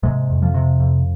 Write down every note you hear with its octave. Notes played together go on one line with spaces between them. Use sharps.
G#2 C3 G#3
F2
F2 F3
C3
F2